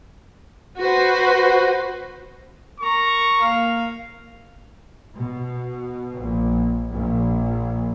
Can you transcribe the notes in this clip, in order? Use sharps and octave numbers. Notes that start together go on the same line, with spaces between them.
F#4 B4 C5
A#4 A#5 C#6
A#3 F5
B2
A#1
A#1